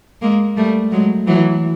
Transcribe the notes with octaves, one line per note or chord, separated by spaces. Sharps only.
G#3 A#3
G3 A3
F#3 G#3
E3 F#3